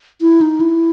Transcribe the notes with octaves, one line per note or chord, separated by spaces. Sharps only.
E4
D#4
E4